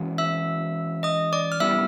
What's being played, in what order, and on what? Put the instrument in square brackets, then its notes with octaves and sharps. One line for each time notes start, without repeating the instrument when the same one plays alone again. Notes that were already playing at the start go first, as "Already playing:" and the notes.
Already playing: [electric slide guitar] E3 G#3 C#4 F#4
[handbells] E5 E6
D#5 D#6
D5 D6
F6
[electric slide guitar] G3 B3 E4 G4 [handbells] E5 E6